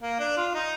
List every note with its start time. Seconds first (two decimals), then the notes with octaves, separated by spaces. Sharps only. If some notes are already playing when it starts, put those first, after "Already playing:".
0.01 A#3
0.19 D4
0.37 F4
0.54 D#4